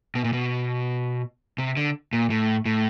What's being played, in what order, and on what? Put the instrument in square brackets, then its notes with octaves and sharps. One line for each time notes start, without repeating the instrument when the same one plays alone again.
[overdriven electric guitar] B2
A#2
B2
C3
D3
A#2
A2
A2